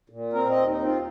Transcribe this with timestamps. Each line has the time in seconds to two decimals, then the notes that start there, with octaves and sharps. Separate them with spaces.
0.10 A#2
0.33 C4 A#4
0.50 D#5
0.56 D#2
0.68 D#4
0.79 C4
0.84 F4